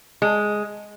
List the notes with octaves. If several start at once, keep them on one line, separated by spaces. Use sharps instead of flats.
G#3